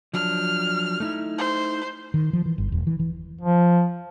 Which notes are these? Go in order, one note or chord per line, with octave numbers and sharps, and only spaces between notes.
F3 F#3 D4 F6
A3 D#4 E4
C5
D#3
F3
E3
G1
E1
E3
E3
F3